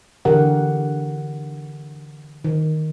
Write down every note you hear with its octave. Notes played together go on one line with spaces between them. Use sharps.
D3 E3 G4 A#4 F#5
D#3